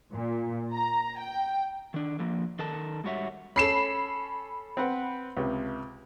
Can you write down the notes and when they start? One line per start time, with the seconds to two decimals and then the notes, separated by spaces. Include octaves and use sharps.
0.14 A#2
0.74 A#5
1.19 G5
1.94 D#3 D4
2.19 D3 F3 A#3
2.59 D#3 A4 A#4 A5
3.04 G#2 G3 F#4 C#5 E5 F#5
3.56 C#4 A4 B5 C7 E7
4.77 C4 B4 F#5
5.37 C#2 C3